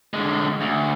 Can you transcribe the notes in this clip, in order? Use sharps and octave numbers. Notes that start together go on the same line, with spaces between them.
D3 G#3
D2